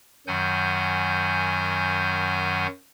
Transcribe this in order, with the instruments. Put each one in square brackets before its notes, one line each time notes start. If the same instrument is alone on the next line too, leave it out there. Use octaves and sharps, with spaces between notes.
[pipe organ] F#2 D#3 F#3 F#5 G#5 G6